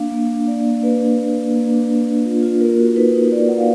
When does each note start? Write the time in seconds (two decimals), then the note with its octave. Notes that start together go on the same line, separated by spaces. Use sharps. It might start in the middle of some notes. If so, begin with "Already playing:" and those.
Already playing: A#3 D4 F5
0.11 A#3
0.30 D4
0.47 A#3 D5
0.65 A#3
0.82 A#3 B4
1.01 D4
1.18 A#3
1.37 A#3
1.54 A#3
1.71 D4
1.90 A#3
2.08 D4
2.25 F4
2.43 F4
2.61 A#3 A#4
2.79 F#4
2.96 D#4 B4
3.15 D#4
3.31 D#4 D5
3.48 A#3 F#5
3.58 F5